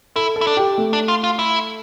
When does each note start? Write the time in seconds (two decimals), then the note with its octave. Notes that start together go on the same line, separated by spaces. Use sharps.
0.16 E4 A4
0.36 A4
0.41 E4
0.47 D4
0.57 G4
0.78 A3
0.93 D4
1.08 F4
1.24 F4
1.39 E4